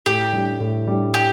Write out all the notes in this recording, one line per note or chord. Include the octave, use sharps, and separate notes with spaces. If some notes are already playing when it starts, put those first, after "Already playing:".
A2 G4
G3 D4
A2
G3 D4
G4